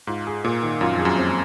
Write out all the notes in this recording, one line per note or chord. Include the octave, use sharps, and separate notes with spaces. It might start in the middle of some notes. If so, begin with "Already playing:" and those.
G#2 F4
G#4
A#2 A#3
D#3
F#2 F4
F2
G#4
F#2
C4